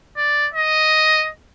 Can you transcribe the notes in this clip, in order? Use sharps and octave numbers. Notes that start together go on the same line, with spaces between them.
D5
D#5